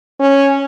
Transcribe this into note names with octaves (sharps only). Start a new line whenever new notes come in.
C#4